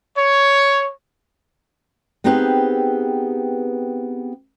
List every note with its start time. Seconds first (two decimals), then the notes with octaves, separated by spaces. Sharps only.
0.17 C#5
2.24 B3 C4 D#4 G4 G#4 B4